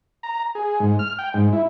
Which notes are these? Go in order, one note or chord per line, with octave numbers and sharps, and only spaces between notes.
A#5
G#4
G#2
F6
G5
G#2
E4